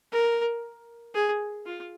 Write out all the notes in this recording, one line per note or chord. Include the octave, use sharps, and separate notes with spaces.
A#4
G#4
F4